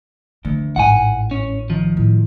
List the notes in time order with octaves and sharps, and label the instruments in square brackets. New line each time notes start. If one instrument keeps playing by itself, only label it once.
[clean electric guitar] D2 [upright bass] D#3 A3
[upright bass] A1 G#2 [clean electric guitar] F#5 G#5
[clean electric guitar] C#4
D#3 F3
[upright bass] A2